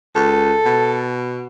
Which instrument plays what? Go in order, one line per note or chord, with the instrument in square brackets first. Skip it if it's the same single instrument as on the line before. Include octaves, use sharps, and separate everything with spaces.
[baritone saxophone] C#2 [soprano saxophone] A4
[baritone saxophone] B2